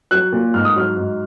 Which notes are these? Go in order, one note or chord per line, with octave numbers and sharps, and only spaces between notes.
F#3 F#6
A#2
G#2 F6
D#6
F#3 F6
G#2